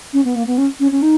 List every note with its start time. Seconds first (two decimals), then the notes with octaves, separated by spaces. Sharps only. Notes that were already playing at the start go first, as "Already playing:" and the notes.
0.13 C#4
0.25 B3
0.35 A#3
0.47 B3
0.58 C#4
0.80 C#4
0.92 C#4
1.02 D#4